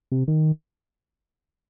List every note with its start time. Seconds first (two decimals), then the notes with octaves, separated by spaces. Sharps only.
0.12 C3
0.28 D#3